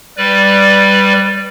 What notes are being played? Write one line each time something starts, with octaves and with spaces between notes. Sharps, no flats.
G3 B4 D5